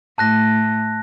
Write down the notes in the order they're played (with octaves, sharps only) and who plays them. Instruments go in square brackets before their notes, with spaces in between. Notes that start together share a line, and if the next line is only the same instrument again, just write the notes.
[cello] A2 [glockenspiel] A5 F#6 A#6